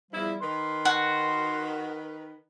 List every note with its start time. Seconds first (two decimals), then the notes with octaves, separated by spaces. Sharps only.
0.11 E2 F3 G3 E4
0.41 D#3 B4 C6
0.85 F#4